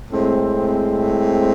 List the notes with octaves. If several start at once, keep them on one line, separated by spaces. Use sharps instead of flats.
A2 G#3 C4